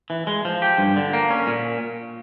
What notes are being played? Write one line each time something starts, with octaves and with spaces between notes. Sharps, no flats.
E3
G#3
F3
G4
G2
D3
A#3
C#4
A#2